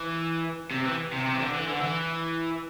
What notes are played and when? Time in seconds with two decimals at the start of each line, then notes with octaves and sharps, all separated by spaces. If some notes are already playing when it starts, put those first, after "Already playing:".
Already playing: E3
0.71 C3
0.85 E3
1.13 C3
1.26 C3
1.33 E3
1.40 D3
1.54 E3
1.68 D3
1.81 E3